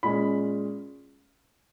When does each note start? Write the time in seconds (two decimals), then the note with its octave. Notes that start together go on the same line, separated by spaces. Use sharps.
0.03 A#2 G#3 C#4 B5